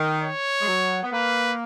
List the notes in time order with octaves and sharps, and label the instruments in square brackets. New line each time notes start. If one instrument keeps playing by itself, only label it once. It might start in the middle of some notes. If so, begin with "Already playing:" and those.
Already playing: [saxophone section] D#3
[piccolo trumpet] C#5
[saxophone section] G#3
F#3
B3
[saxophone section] A#3 [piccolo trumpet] B4